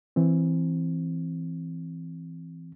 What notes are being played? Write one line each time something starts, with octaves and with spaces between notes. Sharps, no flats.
E3 C4